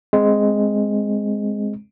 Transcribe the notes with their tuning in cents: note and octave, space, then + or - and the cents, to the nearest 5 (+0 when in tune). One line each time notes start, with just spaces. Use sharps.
G#3 +0 C4 +5